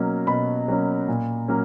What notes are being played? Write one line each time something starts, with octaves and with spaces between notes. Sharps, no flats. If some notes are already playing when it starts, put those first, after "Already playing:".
Already playing: B2 F#3 A#3 C#4
B2 B5
F#3 A#3 C#4
A#2
F#3 A#3 C#4